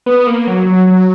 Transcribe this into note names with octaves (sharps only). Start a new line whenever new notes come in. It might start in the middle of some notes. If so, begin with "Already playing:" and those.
B3
A#3
F#3
F#3
F#3